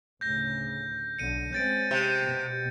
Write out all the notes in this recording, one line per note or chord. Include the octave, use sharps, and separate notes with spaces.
D2 A2 C#3 G6 A#6
B1 B2 D3 C#7 D#7
G#3 C4 C#4 G6 A6 D7
C3 G6 C#7
B2